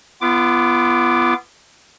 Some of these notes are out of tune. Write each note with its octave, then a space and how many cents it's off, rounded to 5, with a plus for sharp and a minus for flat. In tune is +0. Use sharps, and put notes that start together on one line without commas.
B3 +0 F4 -35 D6 +0